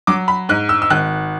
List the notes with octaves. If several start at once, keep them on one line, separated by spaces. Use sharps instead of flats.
F#3 D6
B5
G#2 F#6
E6
E6
G#1 F#6